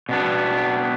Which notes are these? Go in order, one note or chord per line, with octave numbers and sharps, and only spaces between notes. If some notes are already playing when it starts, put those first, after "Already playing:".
B2 B3 D4